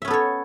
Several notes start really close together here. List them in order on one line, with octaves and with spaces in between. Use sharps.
E5 C#4 B3 A4 C#5